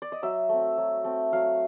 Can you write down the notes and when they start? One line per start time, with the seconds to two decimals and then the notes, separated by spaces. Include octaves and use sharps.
0.02 D5
0.12 D#5
0.22 F#3 E5
0.49 A3 C4
0.78 F#3
1.04 A3 C4
1.33 F#3 F5